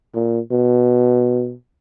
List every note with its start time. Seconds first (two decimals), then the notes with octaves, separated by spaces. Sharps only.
0.14 A#2
0.51 B2